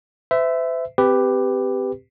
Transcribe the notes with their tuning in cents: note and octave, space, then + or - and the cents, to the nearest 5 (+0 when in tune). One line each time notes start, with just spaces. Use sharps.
C5 -45 E5 +0
C4 -20 G4 +5 B4 +10